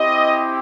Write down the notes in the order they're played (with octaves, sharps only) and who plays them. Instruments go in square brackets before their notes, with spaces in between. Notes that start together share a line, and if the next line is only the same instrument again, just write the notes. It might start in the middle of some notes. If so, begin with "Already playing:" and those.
Already playing: [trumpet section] C4 E4 G4 D#5